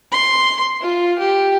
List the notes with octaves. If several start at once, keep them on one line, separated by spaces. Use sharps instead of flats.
C6
F4
G4